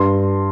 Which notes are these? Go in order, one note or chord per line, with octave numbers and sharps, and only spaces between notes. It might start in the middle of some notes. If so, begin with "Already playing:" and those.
Already playing: G2 C6